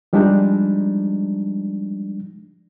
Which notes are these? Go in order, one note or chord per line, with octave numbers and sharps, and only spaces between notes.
F3 G3 G#3 D4 D#4